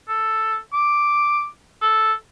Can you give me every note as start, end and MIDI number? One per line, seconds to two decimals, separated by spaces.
0.08 0.57 69
0.73 1.47 86
1.81 2.13 69